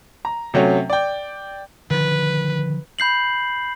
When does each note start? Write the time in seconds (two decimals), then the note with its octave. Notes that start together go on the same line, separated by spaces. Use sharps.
0.25 A#5
0.54 C3 F#3 A3 C#4
0.90 D5 G5
1.91 D3 D#3 F3 B4
2.99 B5 G6 C7 F#7